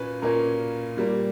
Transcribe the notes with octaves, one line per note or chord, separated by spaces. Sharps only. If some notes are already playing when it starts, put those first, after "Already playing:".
Already playing: A#2 A#3 C#4 B4
A#2 A#3 C#4 A#4
A#2 G3 A#3